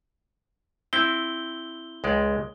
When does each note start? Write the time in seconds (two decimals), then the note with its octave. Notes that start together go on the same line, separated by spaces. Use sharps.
0.93 C4 E4 G5 G7
2.04 C#2 G#3 D5